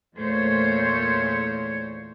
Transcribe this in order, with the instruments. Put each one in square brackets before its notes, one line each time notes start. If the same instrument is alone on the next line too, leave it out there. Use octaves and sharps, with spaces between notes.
[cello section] E2 A#2 A3 C5 C#5